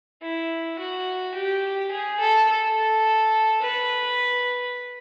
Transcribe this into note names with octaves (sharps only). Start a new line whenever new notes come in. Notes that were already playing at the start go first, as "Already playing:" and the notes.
E4
F#4
G4
G#4
A4
A4
B4